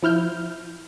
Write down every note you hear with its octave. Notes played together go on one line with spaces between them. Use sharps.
F3 E4 F6 G6